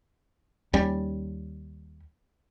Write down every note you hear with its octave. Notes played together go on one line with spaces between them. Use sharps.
D#2 G3 C#4